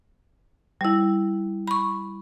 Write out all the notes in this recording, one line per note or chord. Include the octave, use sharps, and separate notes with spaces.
G3 E4
B5 C#6